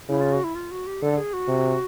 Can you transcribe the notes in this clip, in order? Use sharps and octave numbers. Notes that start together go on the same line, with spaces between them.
C#3 E4
F4
F#4
E4
F4
F#4
G4
D3 A4
G#4
F#4
C3